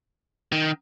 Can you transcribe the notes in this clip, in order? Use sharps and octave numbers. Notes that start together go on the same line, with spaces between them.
D#3